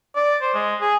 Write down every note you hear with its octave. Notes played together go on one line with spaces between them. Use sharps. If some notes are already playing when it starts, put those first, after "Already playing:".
D5
C5
G#3
G#4